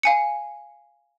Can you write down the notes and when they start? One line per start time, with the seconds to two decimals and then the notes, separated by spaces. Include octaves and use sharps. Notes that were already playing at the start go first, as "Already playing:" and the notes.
0.03 F5 G#5 C#7